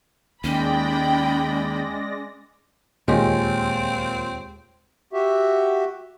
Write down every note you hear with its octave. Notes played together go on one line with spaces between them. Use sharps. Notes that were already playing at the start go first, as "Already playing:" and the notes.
D#2 G#3 C#4 D5 G5 B5 A#6
D#2 A#2 G#3 C4 G4 C#5
F#4 G4 E5